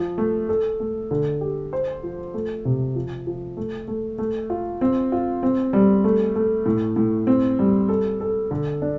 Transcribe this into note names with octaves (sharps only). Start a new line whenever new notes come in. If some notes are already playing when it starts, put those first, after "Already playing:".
Already playing: F3
A3
A4
A3
D3
G4
C5
F3
A3
C3
F3
F3
A3
A3
A3
F4
C4
F4
C4
G3
A3
A3
A2
A2
C4
G3
A4
A4
D3
D4